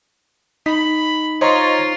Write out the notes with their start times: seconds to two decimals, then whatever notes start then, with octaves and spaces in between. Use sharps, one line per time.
0.66 D#4 B5 B6
1.41 F4 C5 C#5 D#5 A#5 C6 C#6